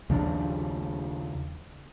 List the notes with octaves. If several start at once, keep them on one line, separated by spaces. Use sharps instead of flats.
D#2 C#3 F3 D4